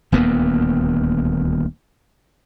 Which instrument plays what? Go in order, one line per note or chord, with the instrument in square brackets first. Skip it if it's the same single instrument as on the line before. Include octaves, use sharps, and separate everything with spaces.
[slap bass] D#1 D2 A#3 B3